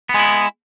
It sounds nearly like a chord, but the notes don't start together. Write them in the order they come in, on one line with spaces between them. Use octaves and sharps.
B3 G#3 E4